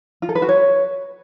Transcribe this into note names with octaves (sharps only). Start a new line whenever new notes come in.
F4
A4
B4
F#4
C#5